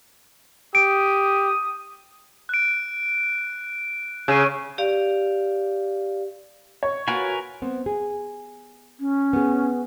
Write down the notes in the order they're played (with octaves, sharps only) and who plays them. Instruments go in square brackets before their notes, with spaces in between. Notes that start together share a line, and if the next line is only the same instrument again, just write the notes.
[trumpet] G4 [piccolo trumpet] D#6 [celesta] D7
[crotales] F#6 D7
[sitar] C#3 [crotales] E6 D#7
[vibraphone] G4 D5 F5
[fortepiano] C#5
[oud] F4 F#4 [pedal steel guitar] A#4 B4 G#5
[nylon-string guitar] B3 C4
G#4
[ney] C#4
[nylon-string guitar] B3 G#4